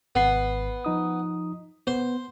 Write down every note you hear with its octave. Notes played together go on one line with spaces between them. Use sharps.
G#1 B3 C7
F3 D#4 D#6
B3 C5